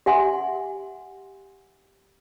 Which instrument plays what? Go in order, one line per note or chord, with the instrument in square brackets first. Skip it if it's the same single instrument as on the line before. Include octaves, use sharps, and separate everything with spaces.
[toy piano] G4 E5 F#5 G#5 C6